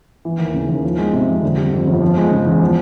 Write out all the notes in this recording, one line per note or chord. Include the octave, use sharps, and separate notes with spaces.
E3
D#2
C#3
D#2
F3
G#3
C3
F2
D3
G3
F2
G1
F3
G#3
C#3
E2
F3